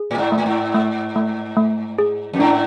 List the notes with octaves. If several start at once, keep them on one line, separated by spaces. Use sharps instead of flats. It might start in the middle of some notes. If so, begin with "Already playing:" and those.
Already playing: G#4
A2
G#2
A3
A2
G#2
A3
A3
A3
G#4
F2
G#2 D4